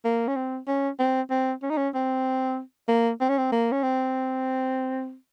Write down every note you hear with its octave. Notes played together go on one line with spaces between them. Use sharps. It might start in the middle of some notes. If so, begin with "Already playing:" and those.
A#3
C#4
C4
C#4
C4
C4
C#4
D#4
C#4
C4
A#3
C4
C#4
C4
A#3
C#4
C4